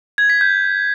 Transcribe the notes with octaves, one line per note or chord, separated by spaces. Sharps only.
G#6
B6
G6